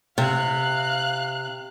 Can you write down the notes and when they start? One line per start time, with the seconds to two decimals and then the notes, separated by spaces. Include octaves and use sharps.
0.18 C3 F5 F#6